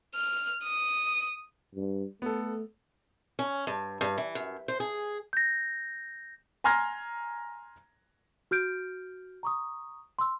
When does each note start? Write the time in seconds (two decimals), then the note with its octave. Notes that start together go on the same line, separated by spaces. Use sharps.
0.15 F6
0.64 D#6
1.75 G2
2.22 A3 B3 A4
3.39 C#4
3.67 G2
4.01 G2
4.18 E3
4.35 F#2
4.68 C5
4.80 G#4
5.33 G6 A#6
6.64 G#5 A#5 C6 F6 G#6 A#6
8.51 F#4 F6 G6 D7
9.43 A#5 C#6 D#6
10.19 C6 E6